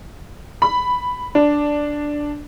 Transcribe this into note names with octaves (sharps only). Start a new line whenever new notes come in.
B5
D4